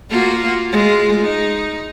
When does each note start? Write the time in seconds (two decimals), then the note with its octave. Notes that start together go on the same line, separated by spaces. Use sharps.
0.10 A#3 F4 F#4
0.72 G#3 F4
1.22 D#4